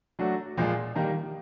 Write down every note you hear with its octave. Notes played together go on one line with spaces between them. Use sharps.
F#3 A3 D4 F#4
A#2 F3 G#3
D#3 G3 A#3